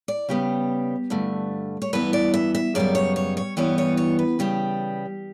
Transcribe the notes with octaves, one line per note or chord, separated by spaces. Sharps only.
D5
C#3 G3 B3 G4
G2 D3 A3
C#5
G2 E3 B3 B4
D5
E5
E5
F#2 C#3 G3 B3 D5
C#5
C#5
C#5
G2 E3 G3 B3 C#5
C#5
C#5
B4
C#3 G3 B3 G4